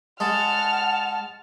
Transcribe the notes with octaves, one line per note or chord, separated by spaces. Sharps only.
G#3 F#5 A5 F6